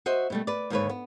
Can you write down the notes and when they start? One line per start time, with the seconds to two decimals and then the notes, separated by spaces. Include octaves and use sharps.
0.06 F#4 C5 D#5 E5
0.30 B2 G3 A3
0.47 B4 D5
0.70 D#2 G#2 D3 A#4 B4 C#5
0.89 B3